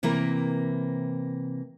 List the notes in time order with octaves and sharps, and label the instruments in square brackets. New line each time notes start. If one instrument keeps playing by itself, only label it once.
[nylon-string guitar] C3 E3 A#3 C4 E4 A#4